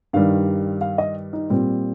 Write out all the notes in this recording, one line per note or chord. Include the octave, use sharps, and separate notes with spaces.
G2 D#3 G3 F5
F5
D#5
D#4
A#2 G3 C4